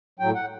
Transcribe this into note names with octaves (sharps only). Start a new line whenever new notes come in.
A2 F#3 G5
F#5